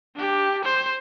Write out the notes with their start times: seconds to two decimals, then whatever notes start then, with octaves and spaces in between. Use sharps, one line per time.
0.15 D4 G4
0.65 C5